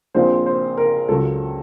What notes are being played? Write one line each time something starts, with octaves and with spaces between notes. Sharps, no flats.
A#1 A#2 F3 C4 C5
C5
A#4
C#2 C#3 F#3 A4